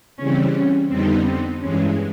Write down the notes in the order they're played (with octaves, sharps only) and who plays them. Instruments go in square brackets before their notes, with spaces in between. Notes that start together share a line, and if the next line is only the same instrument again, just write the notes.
[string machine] C#3 E3 G3 C4 [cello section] C#4
[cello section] C#4
[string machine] F2 D3 G3 B3 D#4 [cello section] C4
[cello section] C4
[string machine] G2 E3 G#3 [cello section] C#4